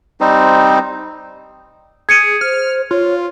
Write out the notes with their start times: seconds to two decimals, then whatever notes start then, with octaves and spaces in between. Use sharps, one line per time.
0.21 G3 C4 D#4 C5
2.09 G#4 G#6 C#7 D#7
2.41 C5 F6
2.91 F4 C#5